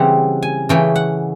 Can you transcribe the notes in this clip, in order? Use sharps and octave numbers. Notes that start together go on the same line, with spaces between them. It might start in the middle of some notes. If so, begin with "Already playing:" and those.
Already playing: C#3 E3 G3 C4 F#5
G#5
C#3 E3 A3 C#4 G5
F#5